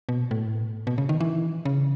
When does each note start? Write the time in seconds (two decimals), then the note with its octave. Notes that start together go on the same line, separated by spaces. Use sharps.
0.09 B2
0.31 A2
0.87 B2
0.98 C#3
1.09 D#3
1.20 E3
1.65 C#3